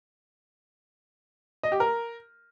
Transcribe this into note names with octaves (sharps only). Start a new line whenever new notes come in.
D#5
G4
A#4